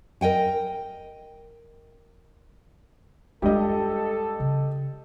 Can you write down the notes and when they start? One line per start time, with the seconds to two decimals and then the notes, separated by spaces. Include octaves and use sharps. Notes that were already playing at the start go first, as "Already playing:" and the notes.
0.21 A#4 D#5 G5 G#5
3.42 G2 G#3 F4 G4 A4 D#5
4.40 C#3